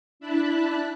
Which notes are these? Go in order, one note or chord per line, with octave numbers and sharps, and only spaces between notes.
D4 E4 A5 B5 F#6